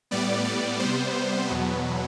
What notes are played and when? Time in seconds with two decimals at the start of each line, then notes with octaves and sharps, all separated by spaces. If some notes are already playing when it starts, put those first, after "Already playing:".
0.11 A2 G3 B3 D5
0.45 D5
0.80 C3 G3 B3 C5
1.48 E2 B2 F#3 B3